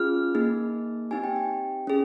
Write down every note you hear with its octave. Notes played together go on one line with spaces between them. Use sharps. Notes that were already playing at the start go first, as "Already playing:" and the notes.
Already playing: C#4 F4 G#4 F6
A#3 D#4 G#4
C4 D#4 G4 G#5
G5
G5
C#4 G#4